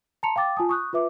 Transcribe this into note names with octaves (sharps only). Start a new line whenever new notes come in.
A5 A#5 C6 C#7 F7
F5 G5 D6 A6
F4 G#5 A5 D#6
C#6 D#6 F#6 G6
F4 B4 E5 D6